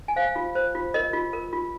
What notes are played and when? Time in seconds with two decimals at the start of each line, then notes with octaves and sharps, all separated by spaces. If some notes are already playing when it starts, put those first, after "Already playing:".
0.08 G#5
0.16 C5 F5
0.36 F4
0.55 C5
0.75 F4
0.94 A#4 D#5
1.13 F4
1.33 A#4
1.53 F4